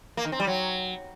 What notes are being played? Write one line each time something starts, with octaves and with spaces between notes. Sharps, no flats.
A#3
D#3
C4
G3
F#3